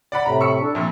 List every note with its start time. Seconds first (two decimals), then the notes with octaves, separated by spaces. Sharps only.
0.12 D5 F#5 B5
0.26 A2 C3 A#5 B5
0.41 C#6 E6 C#7
0.62 D4 A4
0.75 F2 A#2 E5